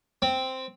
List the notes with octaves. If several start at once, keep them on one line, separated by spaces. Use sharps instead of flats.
C4